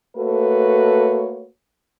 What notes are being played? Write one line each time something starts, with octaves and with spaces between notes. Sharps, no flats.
A3 A#3 F#4 A4 B4 C#5